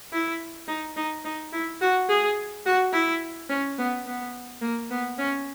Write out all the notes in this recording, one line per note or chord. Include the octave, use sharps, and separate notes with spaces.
E4
D#4
D#4
D#4
E4
F#4
G#4
F#4
E4
C#4
B3
B3
A#3
B3
C#4